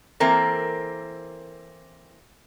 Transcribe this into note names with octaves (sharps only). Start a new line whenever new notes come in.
E3 A#3 C4 A4 A#4